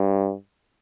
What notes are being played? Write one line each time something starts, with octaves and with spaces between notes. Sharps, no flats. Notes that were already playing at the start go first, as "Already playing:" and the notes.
Already playing: G2